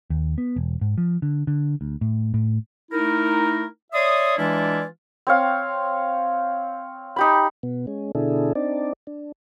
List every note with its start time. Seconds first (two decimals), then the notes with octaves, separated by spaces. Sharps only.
0.10 D#2
0.38 B3
0.56 E1
0.81 G#2
0.98 F3
1.22 D3
1.47 D3
1.81 D2
2.01 A2
2.34 A2
2.92 A3 D#4 E4 A#4
3.93 C#5 D5 E5 C6 D#6
4.37 E3 G#3 D4 E4 F4 D5
5.27 C4 C#5 F5
7.16 D#4 G4 B5
7.63 B2 B3
7.87 G#3 C#4
8.15 B2 D3 D4 E4 G#4 A4
8.55 C4 D4 D#4 D5
9.07 D4